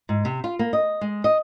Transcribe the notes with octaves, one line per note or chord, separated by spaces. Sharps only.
G#2
C3
F4
A#3
D#5
G#3
D#5